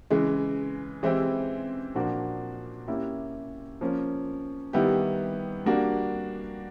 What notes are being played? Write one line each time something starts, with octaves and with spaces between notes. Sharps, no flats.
C#3 E3 G#3
E3 G#3 C4 E4 G4
A#2 F3 A#3 D4 F#4
A#3 C#4 E4 G4
F3 A#3 C#4
D#3 G3 B3 E4 G4
G3 A#3 D4 F#4